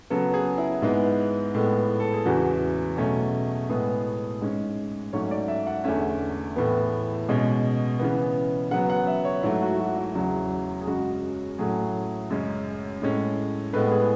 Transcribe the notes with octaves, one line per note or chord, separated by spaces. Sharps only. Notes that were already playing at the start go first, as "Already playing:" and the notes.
C#3 F#3 B3 A4
G#4
E4
G#2 G#3 B3
A2 G#3 B3
A4
G#4
E2 C#3 E3 F#4
B2 F#3 A3 C#4
A2 G#3 B3 G#4
G#2 G#3 C#4
G#2 F#3 A3 C#4 C#5
D5
E5
F#5
E2 D3 A3 C#4 E5
A2 E3 B3
B2 G#3 C#4
C#3 E3 B3
C#3 F#3 B3 F#5
F#5
E5
C#5
G#2 F#3 A3 E4
F#4
F#4
E4
E2 C#3 F#3
G#4
F#2 C#3 G#3 F#4
A2 F#3 A3 C#4 G#4
F#2 C#3 G#3 C#4
A2 G#3 C#4
A2 G#3 B3 B4
G#4